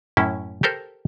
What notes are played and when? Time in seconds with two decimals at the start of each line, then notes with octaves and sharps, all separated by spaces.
0.17 F#2 A2 C#4 E4
0.63 G4 A4 A#4 C5